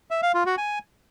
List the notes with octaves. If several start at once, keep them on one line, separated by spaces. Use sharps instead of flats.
E5
F5
F4
F#4
G#5